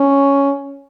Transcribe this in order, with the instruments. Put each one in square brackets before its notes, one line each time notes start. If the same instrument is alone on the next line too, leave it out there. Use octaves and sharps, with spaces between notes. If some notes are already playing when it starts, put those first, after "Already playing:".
Already playing: [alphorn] C#4